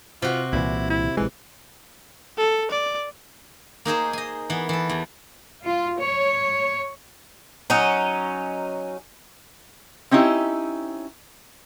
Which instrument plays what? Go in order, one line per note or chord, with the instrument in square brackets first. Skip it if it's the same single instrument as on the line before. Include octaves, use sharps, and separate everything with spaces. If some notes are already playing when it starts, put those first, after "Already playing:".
[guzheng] C3 F#4 [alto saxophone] F4
[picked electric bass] C2 A#2 E3 [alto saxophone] E4
[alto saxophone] E4
[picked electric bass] A#1 G#3 [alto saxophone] E3
[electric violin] A4
D5
[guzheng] A#3 D#4 G#4 C5
D#5 G#5
E3 B3
E3 A4
E2
[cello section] F4
C#5
[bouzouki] F#3 C#4 D#4
[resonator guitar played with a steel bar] C4 C#4 D#4 E4 G4